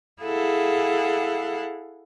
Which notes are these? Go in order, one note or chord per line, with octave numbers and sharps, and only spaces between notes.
E4 G#4 A4 F5 F#5